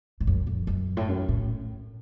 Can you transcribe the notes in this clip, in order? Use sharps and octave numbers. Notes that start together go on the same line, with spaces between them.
A2
F#2
F2
F#2
A2
F#2
A2